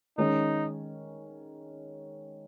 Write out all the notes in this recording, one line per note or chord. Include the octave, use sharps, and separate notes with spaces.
D#3 G#3 C#4 D#4